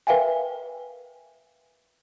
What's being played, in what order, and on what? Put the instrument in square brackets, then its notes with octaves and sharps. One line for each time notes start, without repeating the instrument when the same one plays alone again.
[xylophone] A#4 B4 E5 F5 G5 G#5